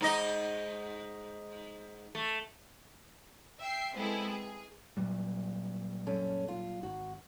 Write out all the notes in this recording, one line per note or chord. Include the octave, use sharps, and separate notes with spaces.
G#2 D#4 D#5
A3
E5 G5 C7
G#3 B3 C4 E4 G#4 A4
G#4
A#2 F#3 G3
F#2 C#4 A4
F4
G#1 F#4